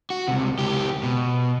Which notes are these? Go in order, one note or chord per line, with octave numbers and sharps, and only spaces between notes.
F#4
C#2 C3
C#2 G4
B2